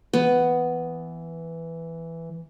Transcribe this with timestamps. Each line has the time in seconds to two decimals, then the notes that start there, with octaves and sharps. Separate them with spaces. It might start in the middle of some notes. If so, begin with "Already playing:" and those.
0.13 E3 B3